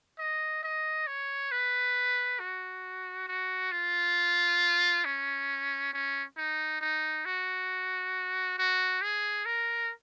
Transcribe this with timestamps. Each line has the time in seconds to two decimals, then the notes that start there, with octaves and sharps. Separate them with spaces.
0.19 D#5
0.63 D#5
1.07 C#5
1.52 B4
2.40 F#4
3.28 F#4
3.72 F4
5.05 C#4
5.93 C#4
6.37 D#4
6.81 D#4
7.25 F#4
8.58 F#4
9.02 G#4
9.46 A#4